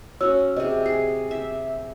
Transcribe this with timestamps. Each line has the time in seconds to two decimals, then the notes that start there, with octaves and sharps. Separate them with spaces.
0.21 C#4 F#4 C#5 E6
0.56 C3 G#4 D#5
0.86 G#4 C7
1.31 E5